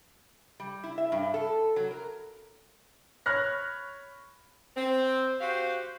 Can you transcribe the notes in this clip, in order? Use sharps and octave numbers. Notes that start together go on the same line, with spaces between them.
G3
E4
E5
G2
A4
F#3
A#4
C#5 B5 F6 F#6 A#6
C4
F#4 G4 C5 F5